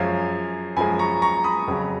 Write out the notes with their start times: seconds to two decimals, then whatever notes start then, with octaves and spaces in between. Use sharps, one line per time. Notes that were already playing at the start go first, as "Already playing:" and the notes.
Already playing: F#2 F3 G#3 C#5 F5
0.77 F#2 F3 G#3 G#5 B5
0.99 A#5 C#6
1.22 A#5 C#6
1.44 B5 D#6
1.68 F2 C#3 F#3